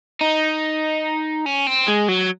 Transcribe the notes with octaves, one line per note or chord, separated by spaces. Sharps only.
D#4
C#4
C4
G#3
F#3